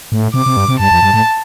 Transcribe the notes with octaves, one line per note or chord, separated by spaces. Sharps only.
A2
C3 D6
C3
G2
C3
G2 A5
F2
G2
A2